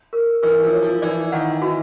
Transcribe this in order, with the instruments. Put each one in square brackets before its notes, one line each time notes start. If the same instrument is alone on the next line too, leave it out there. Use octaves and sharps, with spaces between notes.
[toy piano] A#4
[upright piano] E3 [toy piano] A#4
[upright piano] F3
[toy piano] C#5
[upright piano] F3
[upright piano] E3 [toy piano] D5
[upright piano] D#3 [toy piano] F#5
[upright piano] E3 [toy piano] F#4